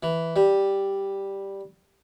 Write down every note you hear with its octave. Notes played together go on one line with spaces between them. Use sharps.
E3
G3